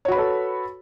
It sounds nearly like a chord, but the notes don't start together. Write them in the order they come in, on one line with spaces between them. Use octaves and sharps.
C#5 F#4 B5 B4 A4